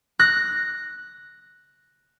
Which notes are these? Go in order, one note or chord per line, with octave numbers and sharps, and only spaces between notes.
F#6 A#6